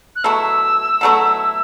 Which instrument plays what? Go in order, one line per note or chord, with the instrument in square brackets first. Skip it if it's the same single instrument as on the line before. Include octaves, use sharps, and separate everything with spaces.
[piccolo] F#6
[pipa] B2 F#3 A3 E4 [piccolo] E6
[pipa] B2 F#3 A3 E4